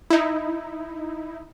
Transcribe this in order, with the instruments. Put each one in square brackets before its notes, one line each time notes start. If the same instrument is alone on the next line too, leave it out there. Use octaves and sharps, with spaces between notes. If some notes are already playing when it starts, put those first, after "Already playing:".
[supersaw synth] D#4 E4